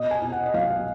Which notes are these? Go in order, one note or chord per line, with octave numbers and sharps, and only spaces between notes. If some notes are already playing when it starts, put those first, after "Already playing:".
Already playing: B2 D#5
G#5
B2
F#5
D#5
B1 F5